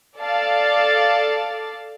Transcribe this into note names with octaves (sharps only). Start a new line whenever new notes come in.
A4 D5 F5 A5